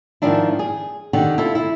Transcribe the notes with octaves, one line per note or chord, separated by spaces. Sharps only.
G#2 D#3 F3 D4 E4
G#4
D3 D#3 G4 F#5
E4 F4 A4
E4